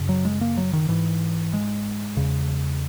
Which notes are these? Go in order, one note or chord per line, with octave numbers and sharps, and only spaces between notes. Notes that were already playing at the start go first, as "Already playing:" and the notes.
Already playing: F#2 C#3
F#3
G#3
A#3
F#3
D#3
G#2 E3
G#3
E2 C#3